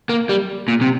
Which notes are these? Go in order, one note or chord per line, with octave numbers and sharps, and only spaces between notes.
A#3
G3
A#2
C3